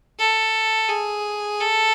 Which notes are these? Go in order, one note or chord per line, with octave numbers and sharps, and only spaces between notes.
A4
G#4
A4